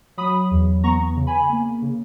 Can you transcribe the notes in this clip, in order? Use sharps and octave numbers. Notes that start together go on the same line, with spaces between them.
F#3 B5 D#6
E2
B3 A#5 C#6
C#3
G#5 B5
A#3
C#3